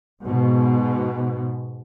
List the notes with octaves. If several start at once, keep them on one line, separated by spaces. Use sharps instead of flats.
G#2 B2